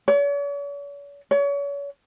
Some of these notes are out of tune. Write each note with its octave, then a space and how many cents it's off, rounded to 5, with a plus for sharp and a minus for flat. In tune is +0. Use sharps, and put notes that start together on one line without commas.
C#5 +45
C#5 +35